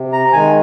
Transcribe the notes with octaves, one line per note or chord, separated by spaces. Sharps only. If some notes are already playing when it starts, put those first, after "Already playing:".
Already playing: C3
A#5
D#3 G#3 G#5